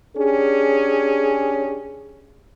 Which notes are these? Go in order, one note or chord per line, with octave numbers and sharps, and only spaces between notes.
C#4 D4 G4 G#4